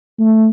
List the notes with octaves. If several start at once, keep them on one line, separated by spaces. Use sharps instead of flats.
A3